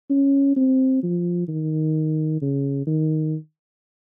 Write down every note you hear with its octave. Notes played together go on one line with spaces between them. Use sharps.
C#4
C4
F3
D#3
C#3
D#3